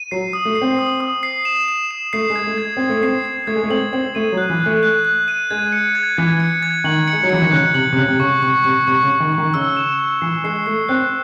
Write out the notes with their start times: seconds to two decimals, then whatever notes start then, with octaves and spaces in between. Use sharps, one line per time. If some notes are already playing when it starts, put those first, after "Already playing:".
Already playing: D#7
0.11 F#3 C7
0.33 D#6
0.45 A3
0.55 C7
0.62 C4
0.79 D#6
1.00 D#6
1.23 C7
1.45 E7
1.68 E7
1.91 E7
2.13 A3 C7
2.30 G#3
2.36 G#6
2.47 A3
2.58 G#6
2.77 C4 G#6
2.89 A3
3.01 C4 C7
3.25 C7
3.47 A3 G#6
3.56 G#3
3.63 A3
3.70 C4 F#7
3.93 C4 F#7
4.15 A3 D#7
4.32 F#3
4.37 F#6
4.50 E3
4.60 F#6
4.66 A3
4.83 F#6
5.05 F#6
5.28 D#7
5.51 G#3 G#6
5.72 C#7
5.95 G#6
6.17 E3 G#6
6.40 C#7
6.63 G#6
6.84 D#3 F#7
7.08 C#7
7.13 G#3
7.23 F#3
7.30 E3 C#7
7.42 D#3
7.52 C#3 F#6
7.74 C3 F#7
7.93 C3
7.97 C#3 F#6
8.08 C3
8.19 C#3 C#6
8.42 C3 C#6
8.64 C3 C#6
8.87 C3 C#6
9.03 C#3
9.10 C#6
9.20 D#3
9.32 C#6
9.38 D#3
9.54 C#3 E6
9.77 E7
9.99 E6
10.22 E3 C7
10.44 G#3 C7
10.66 A3 C7
10.89 C4 F#6